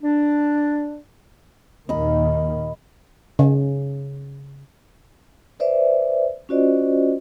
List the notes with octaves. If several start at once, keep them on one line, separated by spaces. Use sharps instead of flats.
D4
D#2 A#2 D#3 D#5 A#5 B5
C#3
B4 C5 D5 E5
C#4 F4 F#4 C5 D5 D#5